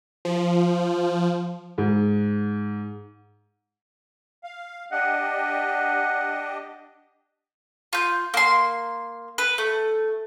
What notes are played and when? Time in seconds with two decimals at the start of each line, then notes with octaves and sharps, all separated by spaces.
0.25 F3
1.78 G#2
4.44 F5
4.92 D4 G4 D#5 F#5
7.93 F4 G6
8.34 A#3 C6
9.38 B4
9.58 A3